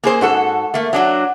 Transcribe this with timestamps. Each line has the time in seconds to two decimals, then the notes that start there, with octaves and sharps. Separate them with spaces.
0.04 A#3 G#4 C5
0.21 G#2 F#4 A4
0.74 A3 A#3
0.93 F#3 D4 F#4